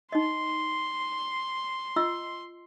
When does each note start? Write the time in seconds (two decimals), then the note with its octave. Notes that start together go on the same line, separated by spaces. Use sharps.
0.12 D#4 D#5 C6
1.96 F4 D#5 E6